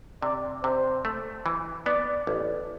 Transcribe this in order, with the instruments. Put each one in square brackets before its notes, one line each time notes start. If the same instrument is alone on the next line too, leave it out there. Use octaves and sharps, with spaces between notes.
[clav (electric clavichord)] C3 [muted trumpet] D5
[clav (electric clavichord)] C3 [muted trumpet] C5
[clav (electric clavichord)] A3
E3
[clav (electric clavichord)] B3 [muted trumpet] D5
[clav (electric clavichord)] A1